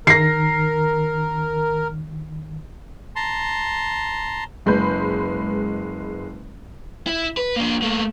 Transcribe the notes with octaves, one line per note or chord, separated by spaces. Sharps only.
D#3 A#4 A#6 C7
A5 A#5 C6
F#1 G#3 B4 B5 G6
E4
B4
A#3 D4
A3 A#3